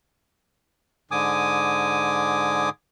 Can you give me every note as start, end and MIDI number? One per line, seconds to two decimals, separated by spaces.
1.11 2.69 44
1.11 2.69 50
1.11 2.69 80
1.11 2.69 86
1.11 2.69 87